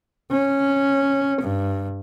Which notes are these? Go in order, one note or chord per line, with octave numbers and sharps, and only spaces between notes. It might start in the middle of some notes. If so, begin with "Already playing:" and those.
C#4
G2